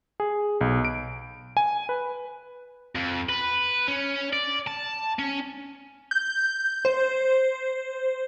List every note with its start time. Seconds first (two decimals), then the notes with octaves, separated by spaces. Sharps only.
0.20 G#4
0.61 B1
0.85 D7
1.57 G#5
1.89 B4
2.95 F2
3.29 B4
3.88 C#4
4.33 D5
4.68 A5
5.19 C#4
6.11 G6
6.85 C5